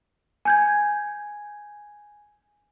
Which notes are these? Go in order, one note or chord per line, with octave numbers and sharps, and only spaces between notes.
G#5 G6 G#6